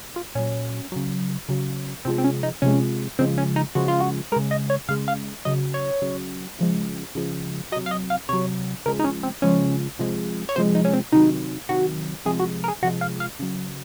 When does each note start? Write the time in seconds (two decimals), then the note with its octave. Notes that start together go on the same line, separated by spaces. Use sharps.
0.16 F4
0.35 A#2 F#3 C#4
0.92 C#3 F#3
1.49 C#3 F#3
2.05 C3 F3 G#3 C4
2.18 C4
2.24 C#4
2.43 D#4
2.62 C3 F3 G#3 C#4
3.19 C#3 F3 G#3 C4
3.38 C#4
3.56 D#4
3.75 C#3 F3 G#3 F#4
3.88 F4
4.00 F#4
4.32 G#3 A#4
4.36 C#3
4.51 D#5
4.70 C#5
4.89 C#3 G#3 F5
5.08 F5
5.45 C#3 F#3 D#5
5.74 C#5
6.02 C#3 F#3
6.59 C#3 F3 G#3
7.15 C#3 F3 G#3
7.72 F#3 D#5
7.76 C3
7.86 F5
7.91 D#5
8.10 F5
8.29 C3 F#3 C#5
8.86 C#3 F3 G#3 A#4
8.99 D#4
9.04 C#4
9.23 C4
9.42 C#3 F3 G#3 C#4
9.99 C3 F3 G#3
10.49 C#5
10.56 C3 F3 G#3 C5
10.75 D#4
10.85 C#4
10.93 C4
11.12 C3 D#3 F#3 D#4
11.69 C3 D#3 F#3 F#4
12.26 C3 F3 G#3 G#4
12.39 F#4
12.64 A#4
12.68 G#4
12.82 C3 F3 G#3 F#4
13.01 F5
13.20 F5
13.39 C#3 F#3